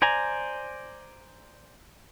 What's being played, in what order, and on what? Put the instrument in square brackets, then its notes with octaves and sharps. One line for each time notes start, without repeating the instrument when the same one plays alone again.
[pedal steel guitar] C5 D5 G#5 A#5